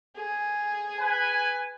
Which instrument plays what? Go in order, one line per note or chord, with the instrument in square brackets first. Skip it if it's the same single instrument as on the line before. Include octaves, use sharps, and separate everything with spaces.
[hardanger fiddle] G#4
[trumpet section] B4 G#5